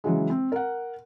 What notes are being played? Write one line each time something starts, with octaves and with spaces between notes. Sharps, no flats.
C#3 E3 F#3 G#3
C4
A#4 F#5